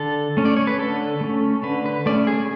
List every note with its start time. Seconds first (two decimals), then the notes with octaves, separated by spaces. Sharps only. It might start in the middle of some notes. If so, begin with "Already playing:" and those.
Already playing: D3 A4
0.37 A3 C#4
0.45 D5
0.57 C#5
0.67 B4
0.79 D3 A4
1.21 A3 C#4
1.63 D3 B4
1.86 B4
2.06 A3 C#4 D5
2.27 G#4